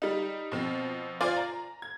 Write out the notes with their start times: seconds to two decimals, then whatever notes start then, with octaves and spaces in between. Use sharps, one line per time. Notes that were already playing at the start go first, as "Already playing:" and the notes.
0.02 G3 D#4
0.52 B2 F3 C4
1.21 F4 C5 D5 G#5 D6
1.37 A#5
1.82 G#6